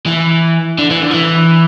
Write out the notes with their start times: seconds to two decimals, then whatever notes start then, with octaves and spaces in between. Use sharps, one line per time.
0.06 E3
0.79 D3
0.91 E3
1.03 D3
1.11 F3
1.14 E3